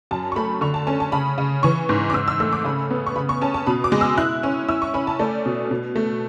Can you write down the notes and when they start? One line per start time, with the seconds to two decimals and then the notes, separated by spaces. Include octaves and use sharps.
0.11 F#2 A5
0.32 C#6
0.36 A3 B5
0.61 D3 C#6
0.74 A5
0.87 C#4 A5
1.00 A5
1.12 C#3 B5
1.38 C#3
1.63 E3 C#6
1.89 G#2
2.10 D6
2.14 G#2 E6
2.28 E6
2.40 A3 E6
2.52 D6
2.65 C#3 B5
2.90 B3
3.06 C#6
3.16 C#3 B5
3.29 C#6
3.42 C#4 A5
3.54 A5
3.67 B2 B5
3.84 D6
3.92 G#3
4.01 E6
4.17 E4 F#6
4.43 C#4
4.68 E4 E6
4.82 C#6
4.94 C#4 B5
5.07 A5
5.19 A3 D5
5.46 B2
5.71 B2
5.96 A3